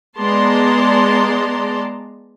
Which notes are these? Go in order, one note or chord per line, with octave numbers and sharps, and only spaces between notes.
G#3 B3 D5 A5 A#5 C6